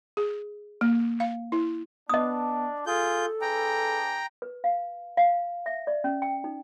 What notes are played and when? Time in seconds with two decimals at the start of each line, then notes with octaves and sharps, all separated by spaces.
0.17 G#4
0.81 A#3
1.20 F5
1.52 E4
2.09 B3 D4 D#5 D#6
2.86 F4 G#4 A4 G6
3.41 D4 G#4 B4 G5 A#5
4.42 B4
4.64 F5
5.17 F5
5.66 E5
5.87 D5
6.04 C#4
6.22 G5
6.44 D#4